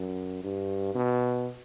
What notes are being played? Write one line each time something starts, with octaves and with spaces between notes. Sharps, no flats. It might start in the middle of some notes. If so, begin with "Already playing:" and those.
Already playing: F#2
G2
B2